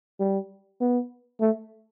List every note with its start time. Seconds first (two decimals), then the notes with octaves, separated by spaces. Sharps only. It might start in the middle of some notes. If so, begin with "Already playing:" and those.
0.20 G3
0.81 B3
1.41 A3